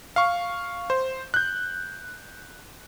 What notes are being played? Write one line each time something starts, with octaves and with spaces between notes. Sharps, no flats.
F5 C#6
C5
F#6 G6